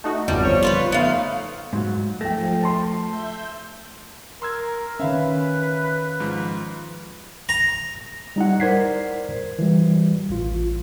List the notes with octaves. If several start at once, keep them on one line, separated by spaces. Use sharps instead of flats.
A3 D#4 F#4
G#1 F2 B2 G3
G1 F3 C#5
F4 A4 B4
A3 B3 D#4 F5
G#2 F#3
F3 A3 G5 A#6
A5 C6
E5 G6
A#4 C6 E6 G#6
D#3 C#4 B4 E5 F5
G#2 F3
A#5
G3 D#4 E4 F#5
A#4 C5 D5 G#6 B6 C7
E3 G3
A1 F4